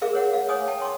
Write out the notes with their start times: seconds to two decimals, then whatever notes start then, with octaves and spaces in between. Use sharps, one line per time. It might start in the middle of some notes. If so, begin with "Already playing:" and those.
0.02 G#4 A#4 E5 F5 D6
0.13 A#4 C#5 F#5
0.33 F5
0.49 C#5 G#5 D6 D#6
0.68 G5 A5
0.82 C6 D6